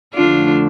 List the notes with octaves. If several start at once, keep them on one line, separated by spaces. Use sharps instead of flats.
F2 D3 F3 A3 D4 F4